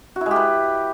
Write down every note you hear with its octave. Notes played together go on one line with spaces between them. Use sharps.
F#4
E4
G#3
G4
B4